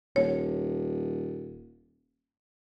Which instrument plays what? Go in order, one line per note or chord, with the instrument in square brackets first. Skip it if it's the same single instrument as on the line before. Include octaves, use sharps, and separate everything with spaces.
[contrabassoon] D#1 [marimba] C#5